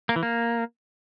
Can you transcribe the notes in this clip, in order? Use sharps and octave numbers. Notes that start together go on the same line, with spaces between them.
A#3
E3
A#3